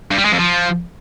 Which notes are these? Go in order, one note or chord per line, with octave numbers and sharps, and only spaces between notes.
G2
G3
G#3
F2
F3